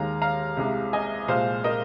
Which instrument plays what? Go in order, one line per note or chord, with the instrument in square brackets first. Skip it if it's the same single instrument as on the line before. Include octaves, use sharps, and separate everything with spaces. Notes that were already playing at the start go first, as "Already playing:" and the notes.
Already playing: [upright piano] D#2 D#3 G#3 F5 A#5
F5 A#5
C2 C3 G#3
D#5 G#5
C2 A#2 F3 G#3 C5 F5
A#4 D#5